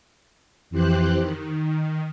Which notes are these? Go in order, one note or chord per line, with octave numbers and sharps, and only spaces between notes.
F2 E3 G4 C5 F#6
D#3